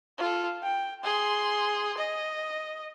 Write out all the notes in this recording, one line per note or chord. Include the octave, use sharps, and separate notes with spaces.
F4 A4
G5
G#4 C6
D#5